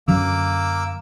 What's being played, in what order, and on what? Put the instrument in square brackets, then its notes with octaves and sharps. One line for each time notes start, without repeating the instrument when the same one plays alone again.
[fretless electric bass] F#2 D3 F#3 [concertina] A#3 D6 E6